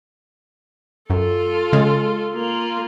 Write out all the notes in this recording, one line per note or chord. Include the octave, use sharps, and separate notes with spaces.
F#2 F4 A4
C#3 G#3
A#3 F4